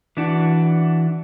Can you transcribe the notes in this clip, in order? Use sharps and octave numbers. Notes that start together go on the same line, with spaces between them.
E3 D4 F#4